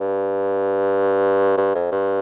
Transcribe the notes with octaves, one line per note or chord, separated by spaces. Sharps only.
G2
G2
F2
G2